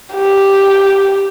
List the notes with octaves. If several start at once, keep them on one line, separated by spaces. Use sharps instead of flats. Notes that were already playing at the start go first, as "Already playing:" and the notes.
G4